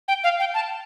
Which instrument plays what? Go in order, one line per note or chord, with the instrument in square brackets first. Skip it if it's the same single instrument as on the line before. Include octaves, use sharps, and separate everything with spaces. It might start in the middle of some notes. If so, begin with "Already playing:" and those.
[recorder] G5
F5
G5
A5